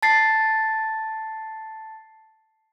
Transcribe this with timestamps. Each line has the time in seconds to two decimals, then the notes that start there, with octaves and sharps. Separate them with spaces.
0.02 A5 A6 C7